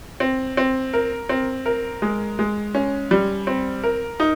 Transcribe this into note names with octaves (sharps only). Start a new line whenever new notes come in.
C4
C4
A#4
C4
A#4
G#3
G#3
C#4
G3
C4
A#4
D#4